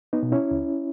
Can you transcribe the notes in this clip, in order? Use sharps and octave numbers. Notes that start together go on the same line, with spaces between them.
B3 D#4
B2
C#4 E4
C#2